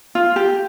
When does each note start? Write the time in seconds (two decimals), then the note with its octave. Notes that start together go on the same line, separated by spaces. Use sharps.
0.15 F4
0.36 G4